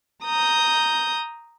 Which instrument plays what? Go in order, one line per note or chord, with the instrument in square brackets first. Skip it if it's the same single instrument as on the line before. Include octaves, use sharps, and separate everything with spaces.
[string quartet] A#5 D#6 G6